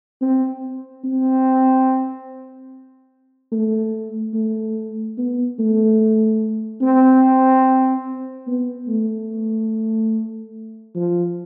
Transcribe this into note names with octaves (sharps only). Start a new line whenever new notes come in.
C4
C4
A3
A3
B3
A3
C4
B3
A3
F3